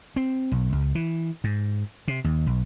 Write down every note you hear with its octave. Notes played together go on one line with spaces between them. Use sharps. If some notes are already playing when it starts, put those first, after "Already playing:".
C4
B1
C#2
E3
G#2
C3
D#2
B1